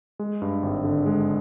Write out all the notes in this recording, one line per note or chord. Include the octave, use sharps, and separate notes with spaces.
G#3
G2
G#1
D3
G#3